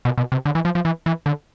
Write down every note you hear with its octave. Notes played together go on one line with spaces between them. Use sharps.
B2
B2
C3
D3
E3
F3
F3
E3
E3
D3